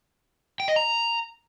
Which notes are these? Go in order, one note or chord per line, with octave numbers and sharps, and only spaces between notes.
G5
D#5
A#5